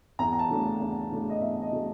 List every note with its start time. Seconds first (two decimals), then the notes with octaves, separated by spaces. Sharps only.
0.19 E2 A#5
0.33 A#5
0.39 A5
0.50 C#3 F#3 A3 D4
0.80 E2
1.12 C#3 F#3 A3 D4
1.30 D#5
1.41 E2 E5
1.62 D#5
1.72 C#3 F#3 A3 D4